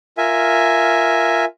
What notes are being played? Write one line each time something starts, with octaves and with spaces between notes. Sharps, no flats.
F4 A#4 E5 G#5